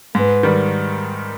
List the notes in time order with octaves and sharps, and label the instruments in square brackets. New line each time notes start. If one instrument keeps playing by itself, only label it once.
[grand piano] G#2 [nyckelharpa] B4
[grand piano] D#3 G3